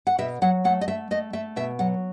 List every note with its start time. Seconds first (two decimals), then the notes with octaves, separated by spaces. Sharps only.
0.07 F#5
0.18 B2 E5
0.42 F#3 F#5
0.64 A3 F#5
0.81 D#5
0.88 A3 E5
1.11 A3 D#5
1.33 A3 E5
1.56 B2 E5
1.79 F#3 F#5